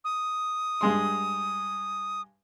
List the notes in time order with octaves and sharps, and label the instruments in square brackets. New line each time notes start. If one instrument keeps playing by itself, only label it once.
[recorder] D#6
[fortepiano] G2 G#3 C6